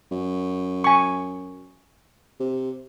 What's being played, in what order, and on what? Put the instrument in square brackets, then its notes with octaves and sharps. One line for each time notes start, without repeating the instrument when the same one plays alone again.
[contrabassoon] F#2
[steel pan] G#5 C#6
[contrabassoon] C3